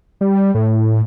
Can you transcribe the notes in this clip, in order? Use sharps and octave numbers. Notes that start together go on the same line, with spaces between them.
G3
A2